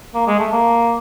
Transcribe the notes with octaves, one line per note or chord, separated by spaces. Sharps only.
A#3
G#3
A3
A#3